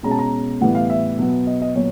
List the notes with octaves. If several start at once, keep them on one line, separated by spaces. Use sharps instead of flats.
B2 G#3 C#4 A#5
A5
A#5
A2 E3 G3 B3 F#5
F5
E5
B2 F#3 B3
D#5
D#5
A#2 F#3 B3 C#5